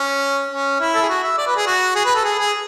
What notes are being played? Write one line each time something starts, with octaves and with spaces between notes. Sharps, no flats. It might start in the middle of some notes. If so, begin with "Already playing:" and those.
Already playing: C#4
C#4
E4
A4
G#4
F#4
E5
D5
B4
G#4
F#4
G#4
B4
A4
G#4
G#4